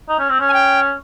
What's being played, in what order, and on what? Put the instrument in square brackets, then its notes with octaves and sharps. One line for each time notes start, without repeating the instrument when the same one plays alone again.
[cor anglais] D#4
C#4
C4
C#4
[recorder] G#5
G5